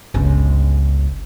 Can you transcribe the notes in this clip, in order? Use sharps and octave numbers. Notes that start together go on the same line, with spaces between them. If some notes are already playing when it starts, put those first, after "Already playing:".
G1 C#2